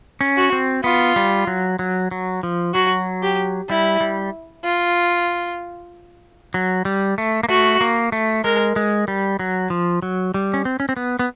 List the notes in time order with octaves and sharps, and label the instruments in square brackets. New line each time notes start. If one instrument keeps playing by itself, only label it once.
[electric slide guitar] C#4
[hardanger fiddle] F#4
[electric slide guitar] C4
[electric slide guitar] B3 [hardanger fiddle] F4
[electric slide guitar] G3
F#3
F#3
F#3
F3
[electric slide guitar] F#3 [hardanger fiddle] F#4
[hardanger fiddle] G4
[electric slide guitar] G3 [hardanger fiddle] E4
[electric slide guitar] G3
[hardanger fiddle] F4
[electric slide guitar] F#3
G3
A3
A#3
[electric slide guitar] A3 [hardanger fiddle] F#4
[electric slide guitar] A#3
A3
[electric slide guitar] G#3 [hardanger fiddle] A#4
[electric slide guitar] G#3
G3
F#3
F3
F#3
G3
C#4
C4
C#4
C4
B3
B3